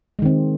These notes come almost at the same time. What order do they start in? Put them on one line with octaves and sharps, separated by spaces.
G#3 D#3 C4